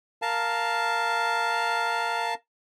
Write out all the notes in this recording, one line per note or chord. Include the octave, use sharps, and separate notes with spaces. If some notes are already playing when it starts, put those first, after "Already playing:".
A#4 F5 A5